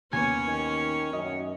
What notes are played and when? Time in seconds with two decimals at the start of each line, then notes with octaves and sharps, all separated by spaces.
0.13 D#2 A#3 B3 C#4 C#5 G#5
0.46 D#3
1.13 F#2 D#5